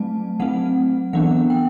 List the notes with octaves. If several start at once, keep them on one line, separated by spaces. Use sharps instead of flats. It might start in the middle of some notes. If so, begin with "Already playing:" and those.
Already playing: F#3 A3 C4 A5
F#3 A3 C4 F#5
E3 B3 D4 F#5
G5